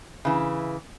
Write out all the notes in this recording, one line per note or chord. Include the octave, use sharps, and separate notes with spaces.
C#3 E3